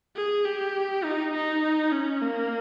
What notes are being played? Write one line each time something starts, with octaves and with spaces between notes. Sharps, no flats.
G#4
G4
D#4
D#4
C#4
A#3